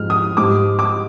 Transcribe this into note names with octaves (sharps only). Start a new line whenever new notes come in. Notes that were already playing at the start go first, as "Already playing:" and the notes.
Already playing: G#2 F3 G#3 F6
D#6
G#2 G3 D6
D6